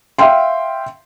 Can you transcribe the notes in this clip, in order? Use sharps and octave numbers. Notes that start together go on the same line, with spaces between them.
E5 F5 G5 C6